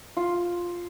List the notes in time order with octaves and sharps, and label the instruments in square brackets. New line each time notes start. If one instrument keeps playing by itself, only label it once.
[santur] F4